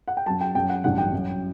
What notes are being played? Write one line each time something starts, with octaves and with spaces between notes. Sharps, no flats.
F#5
G5
F#2 F#3 A5
G5
F#2 F#3 G5
F#5
A1 G2 D#3 F#3 F#5
G5
F#2 F#3